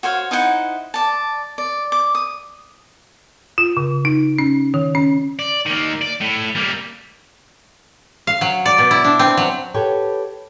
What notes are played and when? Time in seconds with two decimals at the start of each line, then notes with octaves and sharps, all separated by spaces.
0.03 F#4 C5 C#5 F5
0.31 D#4 E4 C5 F#5
0.94 D5 A5
1.58 D5
1.92 D6
2.15 D#6
3.58 F4
3.77 C#3
4.05 D#4
4.39 C#4
4.74 D#3
4.95 C#4
5.39 D5
5.66 D#3 A#3
6.01 D5
6.21 A2
6.55 G3 A#3
8.27 F5
8.41 F#3
8.65 D5
8.78 B2
8.91 E4
9.04 D4
9.19 C4
9.37 F#3
9.74 G4 A4 B4 C#5 F#5 G5